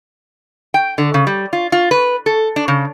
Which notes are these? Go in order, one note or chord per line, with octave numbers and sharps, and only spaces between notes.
G5
D3
C#3
G3
F4
F4
B4
A4
D4
C#3